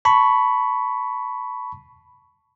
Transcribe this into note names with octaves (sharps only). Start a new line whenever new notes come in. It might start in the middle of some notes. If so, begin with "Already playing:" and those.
A5 B5 C#6